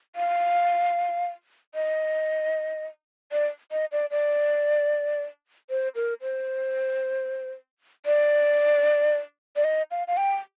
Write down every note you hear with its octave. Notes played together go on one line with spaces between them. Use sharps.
F5
D#5
D5
D#5
D5
D5
C5
A#4
C5
D5
D5
D#5
F5
F5
G5